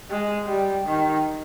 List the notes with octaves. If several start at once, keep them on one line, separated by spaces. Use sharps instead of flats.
G#3
G3
D#3